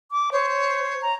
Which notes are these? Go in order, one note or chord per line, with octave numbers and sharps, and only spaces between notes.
D6
C5 C#5
A#5